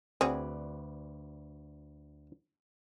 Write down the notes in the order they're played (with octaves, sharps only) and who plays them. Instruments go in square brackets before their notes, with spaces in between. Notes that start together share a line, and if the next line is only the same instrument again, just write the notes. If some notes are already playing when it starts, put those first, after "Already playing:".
[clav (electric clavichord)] D2 B4 D5 [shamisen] C4 F#4 G#4